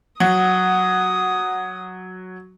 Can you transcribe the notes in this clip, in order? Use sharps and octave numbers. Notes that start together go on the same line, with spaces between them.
F#3 F#5 D#6